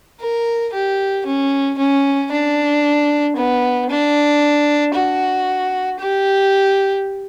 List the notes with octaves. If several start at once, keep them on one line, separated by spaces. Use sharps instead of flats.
A#4
G4
C#4
C#4
D4
B3
D4
F#4
G4